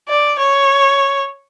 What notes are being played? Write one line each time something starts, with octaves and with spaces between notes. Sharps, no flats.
D5
C#5